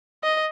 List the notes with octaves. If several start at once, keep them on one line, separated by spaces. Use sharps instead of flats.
D#5